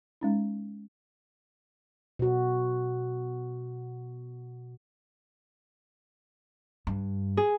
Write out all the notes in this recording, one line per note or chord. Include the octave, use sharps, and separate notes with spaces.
G#3 C#4 D#4
B2 F#4
G2
G#4